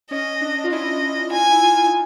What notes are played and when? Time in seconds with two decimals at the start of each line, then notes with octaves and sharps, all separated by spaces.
0.11 C#4 D#5
0.41 D4
0.64 F4
0.72 E4 D#5
1.32 F4 G#5
1.50 E4
1.63 F4
1.78 F4
1.86 D#4